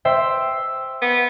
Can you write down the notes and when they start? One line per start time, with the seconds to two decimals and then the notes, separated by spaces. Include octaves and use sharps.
0.05 C5 E5 G5
1.02 B3